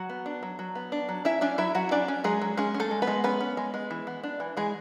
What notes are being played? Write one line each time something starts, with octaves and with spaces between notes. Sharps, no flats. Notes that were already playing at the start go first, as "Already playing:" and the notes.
Already playing: F#3 F#4 F#5
B3
D4
F#3
F#3
B3
D4
F#3
C#4 E4 E5
C#4 D4 D5
F#3 E4 E5
F#3 F#4 F#5
C#4 D4 D5
C#4
F#3 G#3 G#4
F#3
G#3 C#4 G#4
C#4
A3 A4
G#3
B3 B4
G#3
B3 C#4 B4
C#4
G#3
G#3
E3
B3
D4
E3
E3 G#3 G#4